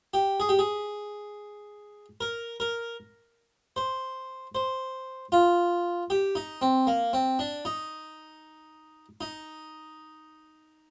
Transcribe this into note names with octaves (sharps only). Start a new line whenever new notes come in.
G4
G#4
G4
G#4
A#4
A#4
C5
C5
F4
G4
D#4
C4
A#3
C4
D4
D#4
D#4